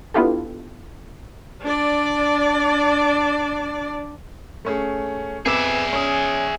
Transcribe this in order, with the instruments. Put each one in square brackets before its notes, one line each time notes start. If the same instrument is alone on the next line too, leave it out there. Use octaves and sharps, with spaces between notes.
[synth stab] B3 D4 E4 F4 G4 A4
[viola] D4 D5
[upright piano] A3 C#4 G#4
[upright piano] F2 B3 D6 [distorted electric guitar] G#4 E5
[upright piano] C#4 D#6